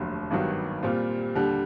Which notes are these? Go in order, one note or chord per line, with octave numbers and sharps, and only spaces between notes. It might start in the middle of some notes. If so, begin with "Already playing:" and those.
Already playing: F1 D#2 D3 F#3 A3
G#1 G2 D#3 F#3 B3
A#2 G3 C4 F4
D#2 D3 G3